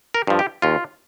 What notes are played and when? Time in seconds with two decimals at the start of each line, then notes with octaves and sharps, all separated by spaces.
0.14 A#4
0.27 G2 F3
0.39 G4
0.62 D#2 F4